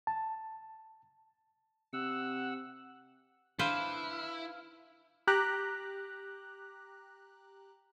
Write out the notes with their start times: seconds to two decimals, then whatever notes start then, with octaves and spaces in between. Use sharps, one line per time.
0.07 A5
1.93 C3 F#5 E6
3.59 D4 E4 B4 C5 F5
5.27 G4 A#5 F#6